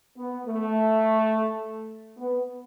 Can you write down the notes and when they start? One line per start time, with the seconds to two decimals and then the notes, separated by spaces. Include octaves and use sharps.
0.18 B3
0.47 A3
2.18 B3